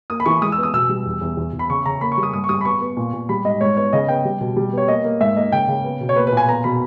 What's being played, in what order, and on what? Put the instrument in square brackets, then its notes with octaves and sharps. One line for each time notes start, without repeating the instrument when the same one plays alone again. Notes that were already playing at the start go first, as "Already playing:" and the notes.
[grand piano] A#3 D#6
B5
E3 C#6
G#3 D#6
E6
B3
D#6
B2 E6
G3
E2
E2
E2
E2
B5
C#3 C#6
C#3 A#5
A#3 B5
C#6
G3
D#6
G2 D#6
C#6
G3 D#6
B5
B3 C#6
B3
A#2
A#2
G3 B5
G#2 D#5
G#2 C#5
B3 C#5
C#3 D#5
B3 G5
G3
B2
G3
B3 C#5
A#3 D#5
A#3
G#2 E5
A#3 D#5
C#3 G5
C#3
B3
B2
C#5
A#3 B4
B4
A#2
G#5
B3 A#5
B2 B5